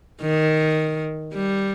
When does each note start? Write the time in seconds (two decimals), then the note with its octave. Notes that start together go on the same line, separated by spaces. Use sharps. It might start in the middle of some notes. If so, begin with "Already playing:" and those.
0.21 D#3
1.34 G3